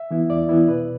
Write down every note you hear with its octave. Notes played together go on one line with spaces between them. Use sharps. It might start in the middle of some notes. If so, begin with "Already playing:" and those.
Already playing: E5
E3 B3 E4
E2 D5
E3 B3 E4
B2 B4